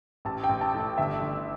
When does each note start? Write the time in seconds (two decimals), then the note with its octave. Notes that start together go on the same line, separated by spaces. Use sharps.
0.25 A1 A5
0.44 G5
0.49 A1
0.61 A5
0.74 A2
0.80 G5
0.98 G1 E5
1.22 G1